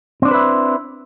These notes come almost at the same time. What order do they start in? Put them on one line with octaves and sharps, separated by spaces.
C4 D4 C5 B4 E4